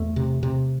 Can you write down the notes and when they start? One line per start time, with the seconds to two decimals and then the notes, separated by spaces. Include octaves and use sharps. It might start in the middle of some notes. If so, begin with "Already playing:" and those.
Already playing: E2 A3
0.16 C3
0.43 C3